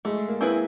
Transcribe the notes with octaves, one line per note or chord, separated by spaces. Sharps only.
G#3 A3
A#3
C4 E4 G#4 B4